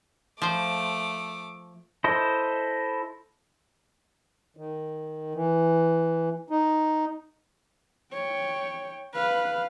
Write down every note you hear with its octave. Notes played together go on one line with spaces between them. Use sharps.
F3 A3 C5 D6
E4 A4 C5 D#5
D#3
E3
D#4
C#5 G5
B4 F5